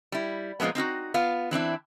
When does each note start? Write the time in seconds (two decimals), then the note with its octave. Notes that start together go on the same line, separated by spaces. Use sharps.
0.12 G3 E4
0.60 A#2 F3 G#3 A3 B3
0.75 C4 D#4 F4 F#4
1.14 B3 F4 F5
1.51 E3 C4 D4 E4